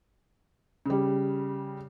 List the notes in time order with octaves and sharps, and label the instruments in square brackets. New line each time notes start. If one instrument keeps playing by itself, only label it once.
[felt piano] C#3 G3